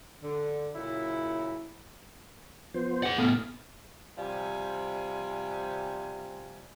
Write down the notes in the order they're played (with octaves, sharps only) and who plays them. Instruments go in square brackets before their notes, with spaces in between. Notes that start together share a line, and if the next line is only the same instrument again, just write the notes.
[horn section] D3
A#2 C#3 F#3 E4
[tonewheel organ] F3 B3 C5
[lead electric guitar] G#4 F#5
[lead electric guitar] A2 B3 [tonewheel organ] A4 F5
[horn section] C3 F3 G3 G#5